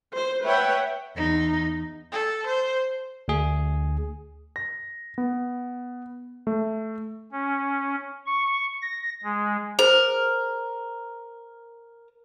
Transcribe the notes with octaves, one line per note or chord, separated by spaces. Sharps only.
C5
B4 C#5 E5 F#5 G5
E2 D#4
A4
C5
D2 G#4
A#6
B3
A3
C#4
C#6
A#6
G#3
G#4 A#4 C5